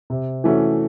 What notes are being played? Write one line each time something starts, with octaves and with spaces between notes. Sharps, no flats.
C3
E3 A3 C#4 F#4